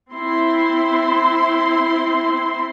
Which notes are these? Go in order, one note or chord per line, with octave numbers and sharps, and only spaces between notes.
C4 E4 C6